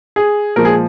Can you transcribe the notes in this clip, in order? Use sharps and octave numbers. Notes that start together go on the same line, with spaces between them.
G#4
A#2 F3 G#3 A#4
G#4